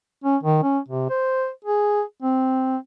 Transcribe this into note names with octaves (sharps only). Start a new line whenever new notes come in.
C#4
D#3
C#4
C3
C5
G#4
C4